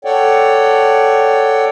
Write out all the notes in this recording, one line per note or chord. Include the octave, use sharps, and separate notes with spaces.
A4 C#5 D5 F#5 G5